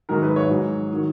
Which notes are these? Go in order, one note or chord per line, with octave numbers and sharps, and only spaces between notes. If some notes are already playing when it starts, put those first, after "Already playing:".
G#2 D#3 F#3 A#4
B4
C#5
G#2 F#3
D#3 F#3